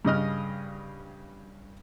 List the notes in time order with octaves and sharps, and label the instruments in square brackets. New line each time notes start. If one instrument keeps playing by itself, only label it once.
[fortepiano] G2 C#3 D#5 F6